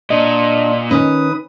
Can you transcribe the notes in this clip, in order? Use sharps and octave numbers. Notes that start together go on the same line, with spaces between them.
A#2 D4 D#5
D#3 C#4 B4 D#6